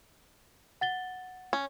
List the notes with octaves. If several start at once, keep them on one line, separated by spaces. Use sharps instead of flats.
F#5 A6 G7
C#4